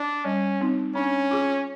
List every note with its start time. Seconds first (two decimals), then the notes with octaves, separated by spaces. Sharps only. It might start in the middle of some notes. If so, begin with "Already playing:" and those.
Already playing: D4
0.25 G3 C#4
0.61 C4 D#4
0.95 C#4 D4
1.31 F4 G#4